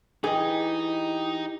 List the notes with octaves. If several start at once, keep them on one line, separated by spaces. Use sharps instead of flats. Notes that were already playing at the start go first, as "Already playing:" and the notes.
E3 D#4 G4 G#4 D#5